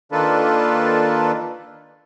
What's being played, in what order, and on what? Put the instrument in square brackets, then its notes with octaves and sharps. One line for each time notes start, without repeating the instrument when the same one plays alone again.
[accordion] D#3 A#3 D4 F4 A4 B4